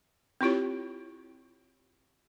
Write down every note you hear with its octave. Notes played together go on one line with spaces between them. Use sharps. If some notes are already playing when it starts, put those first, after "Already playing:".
C4 E4 F4 G4 C#5